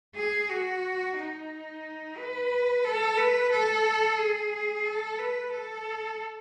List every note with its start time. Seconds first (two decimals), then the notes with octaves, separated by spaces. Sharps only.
0.15 G#4
0.49 F#4
1.17 D#4
2.17 B4
2.84 A4
3.17 B4
3.51 A4
4.18 G#4
4.85 A4
5.19 B4
5.52 A4